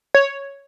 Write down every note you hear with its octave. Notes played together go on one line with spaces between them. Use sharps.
C#5